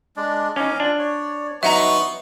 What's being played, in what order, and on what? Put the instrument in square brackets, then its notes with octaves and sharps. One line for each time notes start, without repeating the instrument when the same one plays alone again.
[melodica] G#3 D4 D5
[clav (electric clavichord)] C#4 D#4 [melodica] F5 G#5 D6
[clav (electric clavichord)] D4 [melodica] F4
[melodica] C#5 D5
[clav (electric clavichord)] F#3 D#4 [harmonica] B3 C#6 [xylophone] E5 F#5 A#5 [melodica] C6